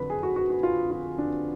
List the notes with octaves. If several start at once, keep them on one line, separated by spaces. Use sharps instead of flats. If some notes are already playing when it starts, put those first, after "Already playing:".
Already playing: F2 D3 F#3 B4
G#4
F#4
F#4
F#4
F4
F4
D4